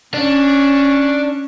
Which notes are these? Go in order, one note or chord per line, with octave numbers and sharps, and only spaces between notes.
C#4 D4